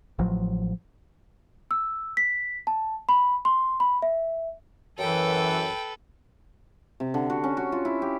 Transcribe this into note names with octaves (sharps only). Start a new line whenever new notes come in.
A1 F3 F#3
E6
B6
A5
B5
C6
B5
E5
F#2 E3 A4 B4 G5
C3
D3
F#4
C#4
F#4
F4
E4
G4